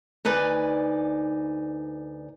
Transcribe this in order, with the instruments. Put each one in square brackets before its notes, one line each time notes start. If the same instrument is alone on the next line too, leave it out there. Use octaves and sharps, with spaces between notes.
[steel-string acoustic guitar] D2 D#4 B4 D5 G#5